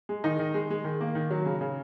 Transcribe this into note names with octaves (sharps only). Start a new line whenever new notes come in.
G#3
D#3 D#4
D#3
G#3
G#3
D#3
A#3
D#3
F#3
C#3
C#3